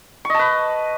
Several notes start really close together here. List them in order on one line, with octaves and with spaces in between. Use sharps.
C#6 D#5 A5 B4